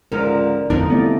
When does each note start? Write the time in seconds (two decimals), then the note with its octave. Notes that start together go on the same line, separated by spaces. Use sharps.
0.12 C#2 G#2 D3 F3 A#4
0.70 D1 E2 D3 F3 D4 D#4 A#4
0.90 C2 A3 B3 E4 D5